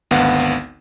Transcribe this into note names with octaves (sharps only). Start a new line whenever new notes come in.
G#1 D2 B3 F5 F#5